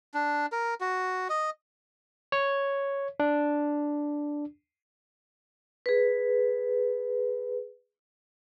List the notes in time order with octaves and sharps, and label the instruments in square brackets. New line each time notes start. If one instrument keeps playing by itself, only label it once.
[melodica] D4
A#4
F#4
D#5
[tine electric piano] C#5
D4
[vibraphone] G#4 B4